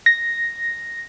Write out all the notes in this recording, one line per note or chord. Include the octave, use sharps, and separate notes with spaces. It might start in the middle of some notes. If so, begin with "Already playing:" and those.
A#6